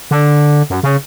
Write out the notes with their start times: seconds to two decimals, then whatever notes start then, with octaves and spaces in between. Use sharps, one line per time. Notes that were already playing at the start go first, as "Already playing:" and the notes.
0.11 D3
0.70 F#2
0.83 C#3